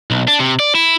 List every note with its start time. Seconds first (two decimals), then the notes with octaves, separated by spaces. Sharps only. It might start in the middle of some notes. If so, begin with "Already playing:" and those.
0.11 B1
0.28 D4
0.40 C3
0.60 D5
0.75 E4